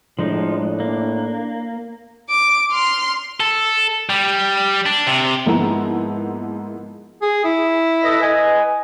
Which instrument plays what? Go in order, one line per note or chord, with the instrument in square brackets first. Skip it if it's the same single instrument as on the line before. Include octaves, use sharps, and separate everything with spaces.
[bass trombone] A2 [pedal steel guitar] F3 G#3 D#4 [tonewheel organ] D4
[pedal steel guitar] A#3
[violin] D6 D7
C6 F6
[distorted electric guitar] A4
G3
D4
C3
[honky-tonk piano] G#2 F3 A#3 B3 E4 A#5
[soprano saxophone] G#4
E4
[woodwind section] A4 B4 D#5
B4 D#5 G#5